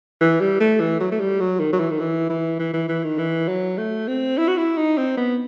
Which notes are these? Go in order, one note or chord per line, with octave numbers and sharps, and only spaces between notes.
E3
G3
A3
E3
F#3
A3
G3
F#3
D#3
F#3
E3
D#3
E3
E3
E3
E3
E3
D#3
E3
F#3
A3
C4
E4
F#4
E4
D#4
C4
B3